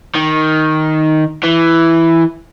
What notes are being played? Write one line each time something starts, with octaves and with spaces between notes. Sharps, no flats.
D#3
E3